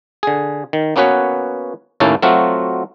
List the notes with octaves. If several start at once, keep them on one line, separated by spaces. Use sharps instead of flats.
D3 G#4
D#3
A#3 B3 C#4 F#4 B4 C#5
D#2 A2 A#3 C#4 E4 A5
F#3 A3 C4 F4 F#4